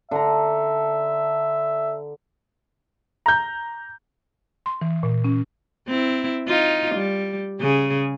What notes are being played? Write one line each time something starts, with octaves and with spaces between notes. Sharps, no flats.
D3 E5 A#5
A#5 G6
C6
E3
A#2
C#4
C4 E4
D#4 F4
G3
C#3 G#4